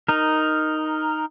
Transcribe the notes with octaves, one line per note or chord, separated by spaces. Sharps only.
D#4 A#4